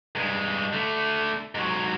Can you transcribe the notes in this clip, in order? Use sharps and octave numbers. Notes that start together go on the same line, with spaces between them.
G2 G#3
D3 A3
G#2 F#3